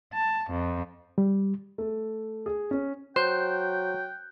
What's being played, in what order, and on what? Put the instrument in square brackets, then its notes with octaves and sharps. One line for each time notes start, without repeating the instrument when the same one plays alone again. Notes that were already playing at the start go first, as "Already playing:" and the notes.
[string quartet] A5
F2
[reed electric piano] G3
[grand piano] A3
G#4
C#4
[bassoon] F#3 [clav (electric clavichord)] C5 [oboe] G5 [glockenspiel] F#6 G6